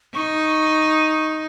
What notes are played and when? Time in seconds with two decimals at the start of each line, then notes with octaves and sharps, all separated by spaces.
0.15 D#4 C#6